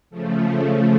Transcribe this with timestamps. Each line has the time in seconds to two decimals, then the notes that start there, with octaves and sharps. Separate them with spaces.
0.10 C#3 F3 A3